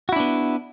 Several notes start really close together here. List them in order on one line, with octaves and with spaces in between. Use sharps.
F#4 E4 D4 B3